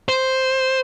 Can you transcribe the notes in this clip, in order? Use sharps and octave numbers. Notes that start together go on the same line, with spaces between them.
C5